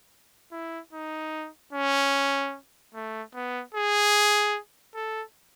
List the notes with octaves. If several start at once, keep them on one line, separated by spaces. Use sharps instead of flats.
E4
D#4
C#4
A3
B3
G#4
A4